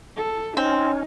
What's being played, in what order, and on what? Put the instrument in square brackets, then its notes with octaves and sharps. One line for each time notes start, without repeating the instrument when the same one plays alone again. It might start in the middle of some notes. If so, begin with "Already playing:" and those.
[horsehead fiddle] A4
[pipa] C4 [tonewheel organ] C#4 [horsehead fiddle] D#4